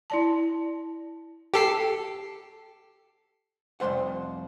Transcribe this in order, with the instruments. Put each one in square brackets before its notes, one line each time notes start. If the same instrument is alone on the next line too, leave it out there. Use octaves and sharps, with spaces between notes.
[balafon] E4 D5 A5
[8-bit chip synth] G4 A4 C7
[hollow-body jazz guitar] C2 F2 C#3 C5 F#5